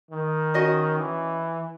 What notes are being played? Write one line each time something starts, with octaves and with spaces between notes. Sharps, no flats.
D#3
C#4 F#4 D#5
E3